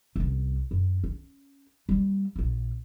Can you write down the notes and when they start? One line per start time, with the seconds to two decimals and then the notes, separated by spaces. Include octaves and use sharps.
0.16 C2 C#4
0.71 F#2
1.04 C#4
1.89 G3 A#3
2.36 A#1 F4